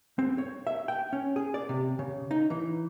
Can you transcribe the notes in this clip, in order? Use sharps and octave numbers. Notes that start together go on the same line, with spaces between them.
C4
C#5
E5
G5
C#4
G#4
D5
C3
C#3
D#4
E3